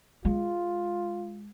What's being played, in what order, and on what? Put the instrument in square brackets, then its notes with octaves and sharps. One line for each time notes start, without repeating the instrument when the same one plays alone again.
[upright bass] G#3 [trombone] F4